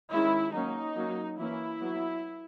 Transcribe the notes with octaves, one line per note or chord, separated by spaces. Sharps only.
D#3 G#3 C#4 E4
F#3 A#3 C#4 D#4
F#3 A#3 C#4
E3 A#3 C#4 E4
F#3 B3